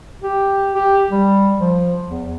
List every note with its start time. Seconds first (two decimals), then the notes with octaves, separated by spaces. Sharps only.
0.23 G4
0.74 G4
1.10 G3
1.58 F3
2.07 E2